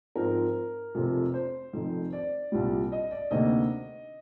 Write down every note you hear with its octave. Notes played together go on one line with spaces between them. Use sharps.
G#2 F3 C4 A#4
F1 F2 C3 F3
C5
F1 F2 D#3
D5
C2 A#2 G3
D#5
D5
D2 C3 D#3 A#3 D#5